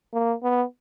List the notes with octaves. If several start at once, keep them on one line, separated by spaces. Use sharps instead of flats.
A#3
B3